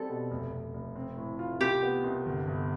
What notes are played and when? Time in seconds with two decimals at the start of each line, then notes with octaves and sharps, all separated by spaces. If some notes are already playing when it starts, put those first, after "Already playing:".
Already playing: G3 C4 A4
0.09 B2
0.31 F1
0.53 F1
0.74 F1
0.96 C4
1.17 A2
1.39 F4
1.61 C2 G4
1.83 B3
2.04 C2
2.26 G1
2.48 G1